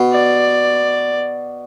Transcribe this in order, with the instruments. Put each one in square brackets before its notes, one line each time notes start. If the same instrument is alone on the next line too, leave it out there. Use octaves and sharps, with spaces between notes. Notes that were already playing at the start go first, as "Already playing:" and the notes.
Already playing: [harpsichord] B2
[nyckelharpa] D5